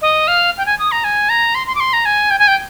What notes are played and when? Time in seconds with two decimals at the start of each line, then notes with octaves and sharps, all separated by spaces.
0.02 D#5
0.28 F5
0.58 G5
0.66 G#5
0.79 D#6
0.92 A#5
1.04 G#5
1.29 A#5
1.55 C6
1.67 C6
1.75 D6
1.80 C6
1.93 A#5
2.06 G#5
2.31 G5
2.39 G#5
2.48 G5